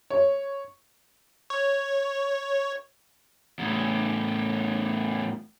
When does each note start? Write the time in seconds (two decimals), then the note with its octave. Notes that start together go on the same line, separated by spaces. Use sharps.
0.10 C#5
1.50 C#5
3.59 E2 A2